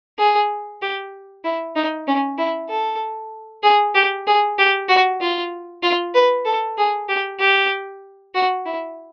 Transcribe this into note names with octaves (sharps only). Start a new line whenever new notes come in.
G#4
G4
E4
D#4
C#4
E4
A4
G#4
G4
G#4
G4
F#4
F4
F4
B4
A4
G#4
G4
G4
F#4
E4